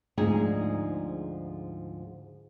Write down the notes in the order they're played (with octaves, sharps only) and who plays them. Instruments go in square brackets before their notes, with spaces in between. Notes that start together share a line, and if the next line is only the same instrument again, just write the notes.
[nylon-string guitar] D2 G#2 F3 D#4 G#4 G#5